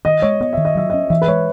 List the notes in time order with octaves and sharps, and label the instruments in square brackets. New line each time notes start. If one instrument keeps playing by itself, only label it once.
[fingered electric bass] D#3 [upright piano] D#5
[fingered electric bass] G#3 [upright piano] C#5
[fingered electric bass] B3 [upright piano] D#5
[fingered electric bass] D#3 [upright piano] E5
[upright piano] D#5
[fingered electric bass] F#3 [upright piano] E5
[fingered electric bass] C#4 [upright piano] D#5
[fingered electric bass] E3 [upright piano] E5
[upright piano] B4
[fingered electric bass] G#3 [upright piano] C#5